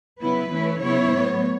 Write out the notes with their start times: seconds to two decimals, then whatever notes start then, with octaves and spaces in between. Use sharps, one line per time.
0.19 C#3 F#3 B3 E4 B4
0.51 E3 A3 C#4 E4
0.81 C#3 F#3 B3 E4 C#5
1.12 A2 F#3 B3